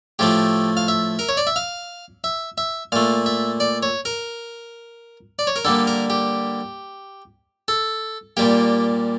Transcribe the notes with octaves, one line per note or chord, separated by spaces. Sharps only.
A2 F3 A3 G4
F5
E5
A#4
C#5
D5
E5
F5
E5
E5
A#2 A3 F5
E5
D5
C#5
A#4
D5
C#5
A#4
D3 G3 A#3 A4
A#4
G4
A4
A#2 G3 A#3 G4